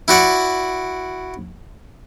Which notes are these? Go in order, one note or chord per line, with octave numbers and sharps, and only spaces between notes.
E4 F#4 D5 F#5